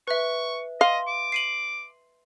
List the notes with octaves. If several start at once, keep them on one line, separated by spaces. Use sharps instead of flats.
B4 E5 C#6
D#5 F5 C6
D6
C7 D#7 F#7